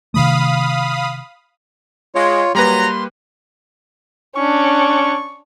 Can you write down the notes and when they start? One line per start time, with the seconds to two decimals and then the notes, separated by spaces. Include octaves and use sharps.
0.14 C3 D#3 A3 F5 B5 D#6
2.15 G#3 F4 C#5
2.55 F#3 G3 A#3 B4 A#5 C6
4.36 C#4 D4 C#6